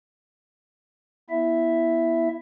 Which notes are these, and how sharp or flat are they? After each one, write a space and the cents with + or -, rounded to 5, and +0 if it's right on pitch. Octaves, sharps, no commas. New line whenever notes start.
B3 -15 E4 +0 E5 +5